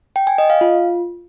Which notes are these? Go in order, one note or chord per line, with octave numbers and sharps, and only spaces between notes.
G5
G#5
D#5
F5
F4